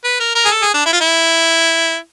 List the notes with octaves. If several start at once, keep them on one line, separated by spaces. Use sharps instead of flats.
B4
A#4
A#4
G#4
A4
G#4
D4
E4
F4
E4